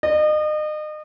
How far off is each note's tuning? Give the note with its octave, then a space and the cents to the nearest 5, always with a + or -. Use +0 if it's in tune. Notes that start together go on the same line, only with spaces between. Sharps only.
D#5 -35